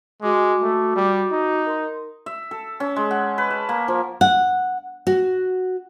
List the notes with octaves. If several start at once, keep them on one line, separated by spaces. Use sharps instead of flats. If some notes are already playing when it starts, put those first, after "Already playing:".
G#3 F#4 D6
A3
G3
D#4
A#4 C6
E5
A4
C#4
G#3
F#5
B4
A5
A#3
F3
F#5
F#4